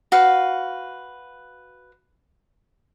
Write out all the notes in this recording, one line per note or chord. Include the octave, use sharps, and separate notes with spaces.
F#4 B4 F5